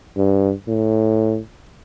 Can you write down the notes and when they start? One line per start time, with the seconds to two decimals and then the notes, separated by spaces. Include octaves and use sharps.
0.17 G2
0.68 A2